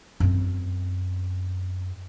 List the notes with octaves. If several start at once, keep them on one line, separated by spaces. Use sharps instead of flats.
F#2 C4